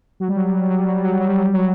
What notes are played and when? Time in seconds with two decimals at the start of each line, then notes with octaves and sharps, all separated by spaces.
0.20 F#3
0.28 G3
0.36 F#3
0.45 G3
0.53 F#3
0.62 G3
0.70 F#3
0.79 G3
0.87 F#3
0.95 G3
1.04 F#3
1.12 G3
1.20 F#3
1.29 G3
1.37 F#3
1.45 G3
1.54 F#3